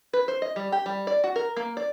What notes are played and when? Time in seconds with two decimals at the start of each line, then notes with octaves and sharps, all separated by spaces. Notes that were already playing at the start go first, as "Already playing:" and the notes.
0.13 B4
0.28 C5
0.42 D#5
0.56 G3
0.72 G4
0.86 G3
1.07 D5
1.24 F#4
1.36 A#4
1.56 A#3
1.77 D5